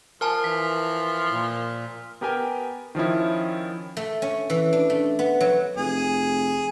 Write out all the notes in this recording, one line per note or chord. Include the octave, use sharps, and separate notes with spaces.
F3 A#4 G#5 A5 F6
E3 B6
A#2
B3 G4 A#4 G5 G#5
D#3 F3 C#4 E4
A3
C#4
E3
D4
A3
B3
F#3
F1 G#4